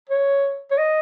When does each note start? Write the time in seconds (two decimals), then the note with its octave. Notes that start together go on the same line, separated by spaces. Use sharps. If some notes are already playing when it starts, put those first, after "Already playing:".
0.09 C#5
0.71 C#5
0.78 D#5